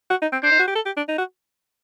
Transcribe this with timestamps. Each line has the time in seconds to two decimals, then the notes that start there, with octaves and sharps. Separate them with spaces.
0.10 F#4
0.22 D#4
0.32 C4
0.43 D4 C5
0.51 D#4
0.59 F#4
0.68 G4
0.75 A4
0.86 G4
0.97 D4
1.08 D#4
1.18 F#4